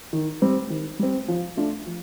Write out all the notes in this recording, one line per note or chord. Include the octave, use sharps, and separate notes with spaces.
D#3
G3 C4
D#3
G3 C4
F3
A3 D4 F4
F3